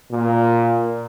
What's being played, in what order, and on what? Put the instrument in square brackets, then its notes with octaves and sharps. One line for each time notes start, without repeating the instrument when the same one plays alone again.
[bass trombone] A#2